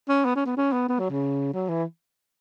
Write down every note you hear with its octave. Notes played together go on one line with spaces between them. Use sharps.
C#4
B3
C#4
B3
C#4
B3
B3
F#3
C#3
F#3
E3